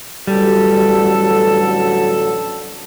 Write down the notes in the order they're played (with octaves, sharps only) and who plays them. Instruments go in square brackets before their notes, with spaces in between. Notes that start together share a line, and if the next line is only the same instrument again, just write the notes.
[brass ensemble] A1 D3 F#3 [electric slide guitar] G3 [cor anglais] A4